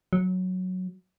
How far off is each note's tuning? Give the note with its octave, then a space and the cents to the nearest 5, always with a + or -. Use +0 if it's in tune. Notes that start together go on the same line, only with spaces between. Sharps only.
F#3 -5